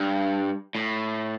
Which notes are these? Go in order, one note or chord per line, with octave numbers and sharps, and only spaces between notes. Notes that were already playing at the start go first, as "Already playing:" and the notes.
Already playing: G2
A2